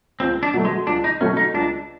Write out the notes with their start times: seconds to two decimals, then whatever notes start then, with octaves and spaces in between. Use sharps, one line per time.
0.20 C#2 C4
0.43 D4
0.54 B2 F#3 A3
0.65 G#3
0.87 C#2 D4
1.04 D#4
1.21 B2 F#3 A3 C#4
1.37 D#4
1.54 C#2 D4